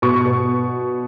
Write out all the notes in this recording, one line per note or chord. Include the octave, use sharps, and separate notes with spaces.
B2 C#6
B2